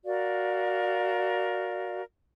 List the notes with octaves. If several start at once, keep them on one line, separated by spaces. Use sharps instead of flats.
F#4 A#4 D5 F5